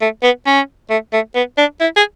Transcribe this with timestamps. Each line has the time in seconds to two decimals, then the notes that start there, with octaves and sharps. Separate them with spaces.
0.01 A3
0.23 B3
0.46 C#4
0.90 A3
1.13 A3
1.35 B3
1.58 D4
1.80 E4
1.96 G#4